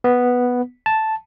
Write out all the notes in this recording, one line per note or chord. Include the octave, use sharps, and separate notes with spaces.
B3
A5